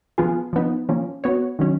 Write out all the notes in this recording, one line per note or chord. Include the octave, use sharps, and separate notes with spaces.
F3 B3 F4 G#4
F3 B3 D#4
F3 A#3 C#4
B3 F#4 C#5
D#3 F#3 C#4